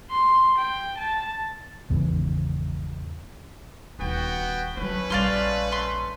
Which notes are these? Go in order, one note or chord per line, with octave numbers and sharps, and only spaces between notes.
C6
G5
A5
G#1 E2 G#2 C#3
D#1 D#2 B3 F#4 G5
F#3 G#3 A3 C#4 B4
A#1 G3 D5 F5 C6
C6